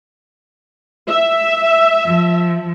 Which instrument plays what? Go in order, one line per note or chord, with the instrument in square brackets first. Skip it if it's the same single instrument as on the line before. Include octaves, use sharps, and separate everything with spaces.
[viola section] E5
[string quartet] F3